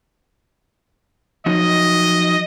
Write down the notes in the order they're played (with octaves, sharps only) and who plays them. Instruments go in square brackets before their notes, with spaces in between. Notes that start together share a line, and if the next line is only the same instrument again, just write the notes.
[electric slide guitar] F3 F#3 D#4 [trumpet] D#5